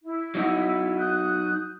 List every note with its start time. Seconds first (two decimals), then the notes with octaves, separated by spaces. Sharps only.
0.04 E4
0.35 F#3 D#4 F#4
0.98 D#6 F#6 G6